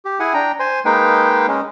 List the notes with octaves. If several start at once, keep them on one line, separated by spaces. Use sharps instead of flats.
G4
E4 G#4 F#5 G#5
D4 G5 A#5
C5 G#5 C6
G#3 A#3 D#4 B4 F5 G5
G#3 C#4